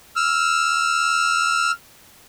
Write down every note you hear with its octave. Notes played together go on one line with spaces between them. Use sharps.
E6 F6